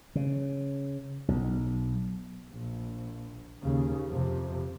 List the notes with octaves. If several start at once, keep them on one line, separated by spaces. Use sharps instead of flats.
C#3
B1
A#1
D#2 C#3
F2 C3